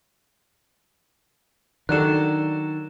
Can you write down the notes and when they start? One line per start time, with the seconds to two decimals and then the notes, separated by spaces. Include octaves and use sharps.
1.89 D#3 F#3 D4 A4 F#6 E7